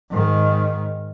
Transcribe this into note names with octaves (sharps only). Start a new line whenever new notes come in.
G#2 D#3